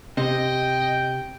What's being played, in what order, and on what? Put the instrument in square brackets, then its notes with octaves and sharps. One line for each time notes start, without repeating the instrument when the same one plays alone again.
[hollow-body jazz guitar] C3 [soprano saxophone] D#5 [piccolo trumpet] G5